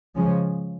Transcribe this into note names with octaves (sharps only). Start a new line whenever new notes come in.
C#3 F3 G#3 C#4